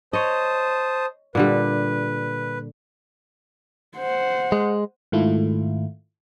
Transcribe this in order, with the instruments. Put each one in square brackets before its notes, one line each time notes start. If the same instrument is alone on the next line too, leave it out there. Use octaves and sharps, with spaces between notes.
[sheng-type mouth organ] C5 A5 D#6 [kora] C#5 D#5
[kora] A#2 D3 G3 [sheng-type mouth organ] B4
[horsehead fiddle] C5 F#5
[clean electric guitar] G#3
[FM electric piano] G#2 D#3 A3 E4 F4